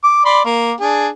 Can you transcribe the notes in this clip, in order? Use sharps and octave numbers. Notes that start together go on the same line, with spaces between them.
D6
D5 B5 C6
A#3
D4 G#4